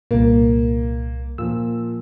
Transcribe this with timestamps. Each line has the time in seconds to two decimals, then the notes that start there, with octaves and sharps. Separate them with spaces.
0.11 C2 A#2 A#3
1.38 A#2 F3 E6